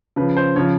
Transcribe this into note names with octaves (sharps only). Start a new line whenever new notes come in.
C#3 F3 B4
C5
C#3 F3 C#5